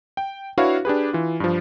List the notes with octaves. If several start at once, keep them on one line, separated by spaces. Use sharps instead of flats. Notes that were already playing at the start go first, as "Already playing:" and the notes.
G5
D4 E4 F#4 B4 C#5 F5
D4 G4 G#4 B4
E3 F4
G2 F3